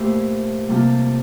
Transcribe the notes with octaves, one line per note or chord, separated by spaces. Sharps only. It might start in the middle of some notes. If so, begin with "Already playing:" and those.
Already playing: A#2 A3 E4 G4 C5
C3 G3 A#3 F4 A4